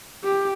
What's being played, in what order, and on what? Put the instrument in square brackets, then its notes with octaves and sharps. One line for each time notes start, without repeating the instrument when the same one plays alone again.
[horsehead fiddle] G4